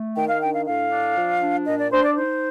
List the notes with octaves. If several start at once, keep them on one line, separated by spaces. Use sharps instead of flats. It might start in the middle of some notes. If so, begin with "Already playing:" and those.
Already playing: A3
D#3 G5
F5
D4 G5
F5
A2 F5
D4
F3
D4
A#2 D#5
D5
D4 C5
D5
D#4 C5